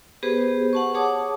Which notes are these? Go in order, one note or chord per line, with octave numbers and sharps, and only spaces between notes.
B3 G4 G#4 B4 C5
F#5 A5 C#6
G#4 C#5 F#5 A5 D6 D#6